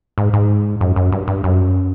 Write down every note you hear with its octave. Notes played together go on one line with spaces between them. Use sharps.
G#2
G#2
F#2
F#2
G2
G2
F#2